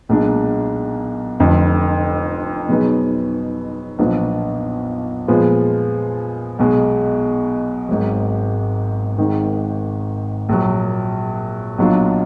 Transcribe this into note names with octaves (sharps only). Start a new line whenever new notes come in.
B1 A#2 G#3 D4
F1 F2 D3
B2 F#3 B3 D#4 G#4
B1 A#2 F3 B3 D4
A#2 F3 G#3 B3
B1 B2 G#3
G#1 G#2 F#3
G#1 G#2 D#3
A#1 A#2 F#3
B1 A#2 F#3 D4 F4